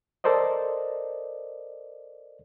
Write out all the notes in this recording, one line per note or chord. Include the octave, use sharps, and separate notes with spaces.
A4 A#4 C5 D5 D#5